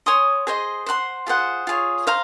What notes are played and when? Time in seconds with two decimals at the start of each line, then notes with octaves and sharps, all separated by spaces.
0.06 C#5 G#5 C6 D#6
0.47 G#4 C5 D#5
0.86 C5 F#5 C6
1.27 F4 G#4 C5 F#5
1.67 F4 G#4 C#5
2.07 C5 F5 A#5